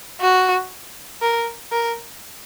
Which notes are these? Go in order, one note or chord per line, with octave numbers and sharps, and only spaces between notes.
F#4
A#4
A#4